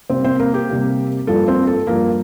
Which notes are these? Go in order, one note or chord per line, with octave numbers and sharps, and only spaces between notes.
C3 G3 A#3 C4 C5
C4 C5
A#3 A#4
G4
C3 G3 A#3
G2 F3 A#3 A4
C4 C5
A4
G2 F3 A#3 A#4